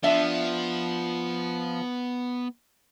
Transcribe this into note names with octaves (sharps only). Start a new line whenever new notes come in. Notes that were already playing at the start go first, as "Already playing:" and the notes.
F3 B3 D4 E5